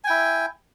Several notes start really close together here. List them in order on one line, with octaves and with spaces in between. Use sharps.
G#5 G5 E4